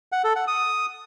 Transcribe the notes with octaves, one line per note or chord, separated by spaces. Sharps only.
F#5
A4
F#5
D#6